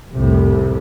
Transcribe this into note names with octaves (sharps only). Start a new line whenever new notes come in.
C2 F2 A2 C3